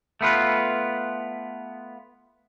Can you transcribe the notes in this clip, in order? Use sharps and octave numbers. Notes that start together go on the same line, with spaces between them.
A3 B3 F4 B4